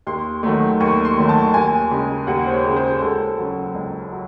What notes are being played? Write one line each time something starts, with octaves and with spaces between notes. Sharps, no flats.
D#2 C6
D#3 F#3 A3
D#2 C#6
C6
D#3 F#3 A3
A5
D#2 G#5
C#3 G#3
D#2 F#5
C5
C#5
C#3 G#3
C5
C#2 A4
C#3 F#3
C#2
F#3